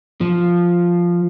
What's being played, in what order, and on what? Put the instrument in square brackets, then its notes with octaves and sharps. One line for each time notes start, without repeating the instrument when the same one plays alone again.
[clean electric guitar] F3